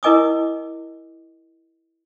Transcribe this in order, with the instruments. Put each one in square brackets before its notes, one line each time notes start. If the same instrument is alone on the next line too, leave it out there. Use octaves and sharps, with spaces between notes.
[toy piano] E4 A#4 D#5 G#5 D6 D#6